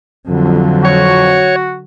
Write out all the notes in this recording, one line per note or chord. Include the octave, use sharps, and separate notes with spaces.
F2 D3 F#3
F#4 C#5